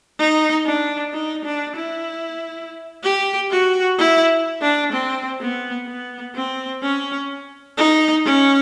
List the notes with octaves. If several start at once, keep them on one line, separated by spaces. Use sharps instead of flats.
D#4
D4
D#4
D4
E4
G4
F#4
E4
D4
C4
B3
B3
C4
C#4
D#4
C#4